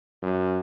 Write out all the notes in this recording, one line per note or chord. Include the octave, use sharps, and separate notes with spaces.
F#2